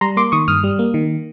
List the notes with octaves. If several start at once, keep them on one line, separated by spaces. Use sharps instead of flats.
G3 A#5 C6
A#3 C6 D6
D#3 C#6 D#6
G2 D#6 F6
G3
A#3
D#3